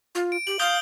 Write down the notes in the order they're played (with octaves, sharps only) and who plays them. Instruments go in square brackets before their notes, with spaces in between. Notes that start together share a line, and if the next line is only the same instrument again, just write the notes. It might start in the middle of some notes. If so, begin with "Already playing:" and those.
[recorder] F4
[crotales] D7
[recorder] G4 [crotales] F#7
[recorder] F5 [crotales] D#6 G6 G7